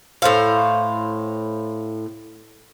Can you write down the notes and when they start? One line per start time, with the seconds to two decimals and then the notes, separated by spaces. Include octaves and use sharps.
0.22 A2 C5 F5